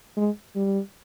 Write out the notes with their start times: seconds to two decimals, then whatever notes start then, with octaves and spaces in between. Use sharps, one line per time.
0.17 G#3
0.55 G3